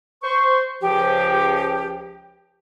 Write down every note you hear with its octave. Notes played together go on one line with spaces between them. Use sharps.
C5 C#6
C#2 F3 G4